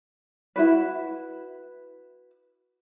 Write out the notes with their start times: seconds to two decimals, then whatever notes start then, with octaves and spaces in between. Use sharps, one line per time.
0.56 E4 F#4 B4